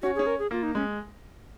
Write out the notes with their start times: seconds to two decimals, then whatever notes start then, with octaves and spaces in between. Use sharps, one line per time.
0.02 C#4 F#4
0.15 G#4
0.19 C#4
0.27 A#4
0.39 G#4
0.51 A#3 F4
0.63 D#4
0.75 G#3 C#4